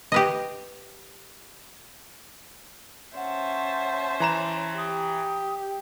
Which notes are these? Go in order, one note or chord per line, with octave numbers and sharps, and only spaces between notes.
G4 B4 D#5
C#4 C5 E5 F#5 A5
E3 A#5 E7
G4 D#6